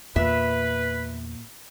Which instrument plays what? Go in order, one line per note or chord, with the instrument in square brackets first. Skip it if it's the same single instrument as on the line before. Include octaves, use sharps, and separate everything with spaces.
[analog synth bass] E2 [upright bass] A#2 [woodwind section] B4 [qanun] E5